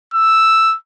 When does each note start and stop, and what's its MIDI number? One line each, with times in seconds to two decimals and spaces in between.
0.14 0.76 88